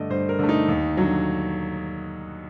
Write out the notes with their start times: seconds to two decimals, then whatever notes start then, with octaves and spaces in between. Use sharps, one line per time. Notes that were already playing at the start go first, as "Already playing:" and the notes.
Already playing: G2 D3 A3 D5 D#5
0.10 G2 C5
0.29 A#4
0.39 D3 A3
0.49 D#4
0.68 D#2
0.97 D3 F#3